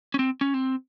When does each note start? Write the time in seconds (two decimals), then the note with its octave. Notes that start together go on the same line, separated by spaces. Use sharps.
0.14 C#4
0.19 C4
0.41 C#4
0.54 C4